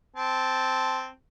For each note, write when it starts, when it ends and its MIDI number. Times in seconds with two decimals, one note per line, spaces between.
0.16 1.08 60
0.16 1.08 81